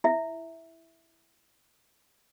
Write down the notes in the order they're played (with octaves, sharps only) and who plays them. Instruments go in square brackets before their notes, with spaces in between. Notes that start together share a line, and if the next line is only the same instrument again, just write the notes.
[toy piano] E4 E5